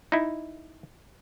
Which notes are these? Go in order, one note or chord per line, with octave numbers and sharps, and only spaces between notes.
D#4 E4